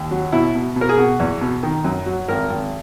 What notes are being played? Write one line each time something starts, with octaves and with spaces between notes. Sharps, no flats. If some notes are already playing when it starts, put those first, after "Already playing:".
Already playing: D#2
F#3
B2 E4
B2
B2
A#4
G#4
B2 F#4
E2
B2
D#3
F#2
F#3
G#1 A#4
G#1